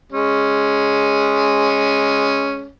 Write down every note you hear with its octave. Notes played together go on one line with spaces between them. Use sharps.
G#3 C#4